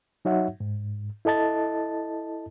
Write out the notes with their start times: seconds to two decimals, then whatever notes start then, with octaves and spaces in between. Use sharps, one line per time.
0.25 F#3 D#4 F#4 C#5 E5 F#5
0.60 G#2
1.25 E4 A4 D#5 A5 A6